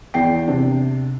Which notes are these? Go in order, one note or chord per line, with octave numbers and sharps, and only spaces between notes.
E2 G5 C7
C3 D4